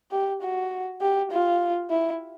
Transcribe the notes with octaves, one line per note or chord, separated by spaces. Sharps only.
G4
F#4
G4
F4
E4